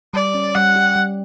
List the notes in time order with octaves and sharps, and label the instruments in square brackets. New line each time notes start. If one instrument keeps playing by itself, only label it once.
[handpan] G3 [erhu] D5
[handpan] C#4
[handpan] G3 [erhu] F#5
[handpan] G4
G3